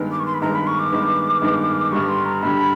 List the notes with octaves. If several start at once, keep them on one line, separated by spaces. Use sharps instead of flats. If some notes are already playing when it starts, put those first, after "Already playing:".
Already playing: G2 D#3 G#3 B3
D6
C#6
C6
B5
G2 D#3 G#3 B3 A#5
B5
C#6
D6
G2 D#3 G#3 B3
G2 D#3 G#3 B3
G2 D3 G3 C#6
C6
A#5
G2 D3 G3 B5